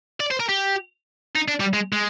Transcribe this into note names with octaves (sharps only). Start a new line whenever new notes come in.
D5
C5
A#4
G4
D#4
D4
G3
G#3
G#3